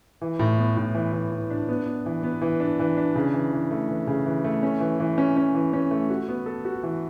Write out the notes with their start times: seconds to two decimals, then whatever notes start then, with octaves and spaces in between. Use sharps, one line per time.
0.21 E3
0.39 A2
0.58 B3
0.77 A2
0.94 E3
1.13 E3
1.31 E3
1.50 D4
1.69 B3
1.86 B3
2.06 E3
2.23 B3
2.41 E3
2.60 D4
2.79 E3
2.97 D4
3.15 C#3
3.34 E3
3.53 E3
3.71 A3
3.89 E3
4.07 C#3
4.26 E3
4.44 A3
4.63 C#4
4.80 E3
5.00 E3
5.18 C#4
5.37 C#4
5.55 E3
5.73 C#4
5.91 A3
6.10 F#4
6.28 B3
6.46 A4
6.65 F#4
6.83 E3